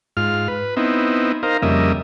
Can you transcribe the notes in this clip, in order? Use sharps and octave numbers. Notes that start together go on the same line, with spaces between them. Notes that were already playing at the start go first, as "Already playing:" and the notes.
G#2 F4 F6
B4
B3 C4 D#4 E4
D#4 A#4 C5 F5
F2 C#3 G3 A#3 D#5 E5